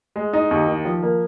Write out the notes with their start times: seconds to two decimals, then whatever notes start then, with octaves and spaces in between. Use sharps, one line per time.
0.16 G#3
0.33 D#4
0.51 D#2
0.68 D#3
0.85 F3
1.03 A#3